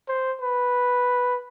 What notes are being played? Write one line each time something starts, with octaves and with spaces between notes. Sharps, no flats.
C5
B4